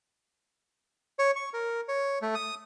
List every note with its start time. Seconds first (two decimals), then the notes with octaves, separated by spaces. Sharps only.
1.19 C#5
1.36 C#6
1.53 A#4
1.88 C#5
2.22 A3
2.35 D#6